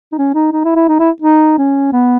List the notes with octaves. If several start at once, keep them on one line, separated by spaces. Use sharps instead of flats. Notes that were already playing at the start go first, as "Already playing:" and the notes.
D#4
C#4
D#4
D#4
E4
E4
D#4
E4
D#4
C#4
B3